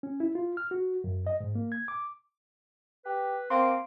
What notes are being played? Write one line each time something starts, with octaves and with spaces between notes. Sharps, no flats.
C#4
E4
F4
F6
F#4
F#2
D#5
G#2
A#3
G#6
D6
G4 B4
A#3 C4 C6 D6